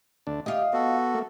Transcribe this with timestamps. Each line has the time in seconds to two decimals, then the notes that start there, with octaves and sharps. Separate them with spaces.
0.27 D2 D4
0.46 F4 G4 D#5
0.73 B3 F#4 A4
1.15 A3 A#3